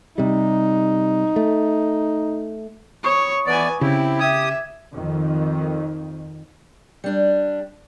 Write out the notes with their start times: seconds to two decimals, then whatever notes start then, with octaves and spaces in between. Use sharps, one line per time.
0.18 C3 G3 D#4
1.36 A3
3.04 C#5 B5 C#6 D#6
3.47 E3 B3 B4 D5 G#5
3.81 C#3 C4 E4 G4
4.20 G4 E5 D#6 G#6
4.93 F2 D#3
7.04 G3 D4